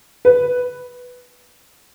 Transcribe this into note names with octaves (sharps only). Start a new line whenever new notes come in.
B4